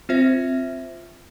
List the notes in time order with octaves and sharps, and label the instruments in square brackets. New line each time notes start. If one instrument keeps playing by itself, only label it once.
[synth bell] C4 F4 C5 E5